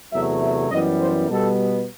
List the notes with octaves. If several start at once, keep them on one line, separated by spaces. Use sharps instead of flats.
E2 C3 F#3 A3 E5
E5
F#2 E3 G3 B3 D#5
C5
B2 G3 B3 A4